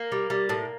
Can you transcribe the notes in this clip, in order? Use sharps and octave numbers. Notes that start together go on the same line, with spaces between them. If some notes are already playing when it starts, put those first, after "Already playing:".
Already playing: A#3
G3
G3
A2